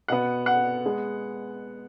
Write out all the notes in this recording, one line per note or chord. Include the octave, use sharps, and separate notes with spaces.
B2 B3 F#5
F#5
G#3 B3